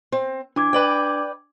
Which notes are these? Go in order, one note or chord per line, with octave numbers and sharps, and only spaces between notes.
C4
E3 D4 D6 G#6
B4 D5 G5